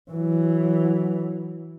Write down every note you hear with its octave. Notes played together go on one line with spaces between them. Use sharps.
E3 F#3